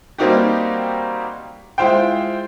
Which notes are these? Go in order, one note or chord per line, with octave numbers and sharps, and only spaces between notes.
G3 A#3 C4 D#4 F#4 G4
G#3 E4 F4 C5 F5 G5